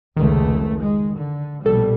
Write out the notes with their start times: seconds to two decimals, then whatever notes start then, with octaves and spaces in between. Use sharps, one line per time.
0.17 F1 C#2 D#3 A3
0.82 G#3
1.17 D3
1.66 A#1 B2 G3 A4